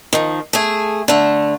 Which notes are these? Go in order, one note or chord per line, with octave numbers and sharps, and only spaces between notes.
D#3 F3
A3 G#4
D3 A3